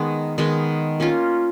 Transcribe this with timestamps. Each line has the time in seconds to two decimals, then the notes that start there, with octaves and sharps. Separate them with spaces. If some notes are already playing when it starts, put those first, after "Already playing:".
Already playing: D#3 G#3 B3
0.38 D#3 G#3 B3
1.00 A#3 C#4 F4